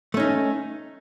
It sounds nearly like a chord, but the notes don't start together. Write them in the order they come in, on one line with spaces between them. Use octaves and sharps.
A3 C#4 D#4